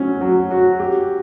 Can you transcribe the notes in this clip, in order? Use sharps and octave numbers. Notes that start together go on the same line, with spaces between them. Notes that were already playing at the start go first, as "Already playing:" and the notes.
Already playing: F#3 C#4
F#3
F#4
G4